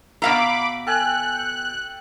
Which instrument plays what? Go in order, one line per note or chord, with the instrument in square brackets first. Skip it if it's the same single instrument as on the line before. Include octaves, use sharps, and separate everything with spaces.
[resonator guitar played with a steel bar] B2 F5 A#5 [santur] E5 [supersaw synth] B5 D6
[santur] A4 G5 G#5 [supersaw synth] F#6